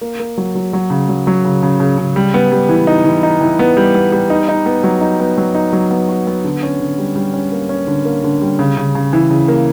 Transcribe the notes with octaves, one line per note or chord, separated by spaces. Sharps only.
A#3
A#3
F#3
F#3
F#3
C#3
F#3
F#3
C#3
C#3
C#3
C#3
G3
B3
G3
E3
D#4
E3
D#4
E3
B3
G3
B3
G3
D#4
D#4
B3
F#3
D#4
B3
F#3
D#4
F#3
B3
F#4
B3
D3
C#4
D3
G3
G3
C#4
A#3
C#4
D3
A#3
D3
G3
C#3
C#3
C#3
E3
C#3
A#3